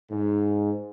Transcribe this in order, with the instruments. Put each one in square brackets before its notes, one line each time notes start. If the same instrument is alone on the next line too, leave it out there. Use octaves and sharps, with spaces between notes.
[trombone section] G#2